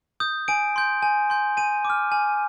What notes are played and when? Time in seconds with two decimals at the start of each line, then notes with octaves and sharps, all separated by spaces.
0.20 D#6 G6
0.48 G#5 D7
0.76 C6 G6
1.02 G#5
1.30 C6 G6
1.57 G#5 D#7
1.85 D6
1.90 F6
2.12 G#5